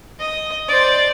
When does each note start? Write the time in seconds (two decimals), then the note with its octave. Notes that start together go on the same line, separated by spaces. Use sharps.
0.20 D#5
0.68 C5 D5